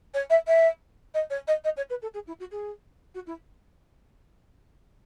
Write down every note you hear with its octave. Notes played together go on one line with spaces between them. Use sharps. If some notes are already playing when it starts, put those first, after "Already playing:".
C#5
E5
E5
D#5
C#5
D#5
D#5
C#5
B4
A4
G#4
E4
F#4
G#4
F#4
E4